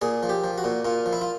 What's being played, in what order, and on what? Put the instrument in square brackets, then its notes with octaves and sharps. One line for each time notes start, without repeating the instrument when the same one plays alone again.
[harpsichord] A#2 G#4
F3
G4
F3
F#4
A#2
A#2 F4
F3
E4
F4